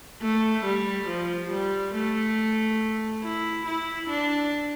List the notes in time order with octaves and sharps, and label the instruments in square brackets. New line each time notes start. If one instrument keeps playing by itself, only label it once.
[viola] A3
G3
F3
G3
A3
E4
E4
D4